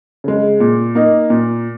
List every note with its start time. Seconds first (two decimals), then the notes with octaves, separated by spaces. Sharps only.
0.24 C#3 G#3
0.60 A#2
0.95 A#3 D#4
1.30 A#2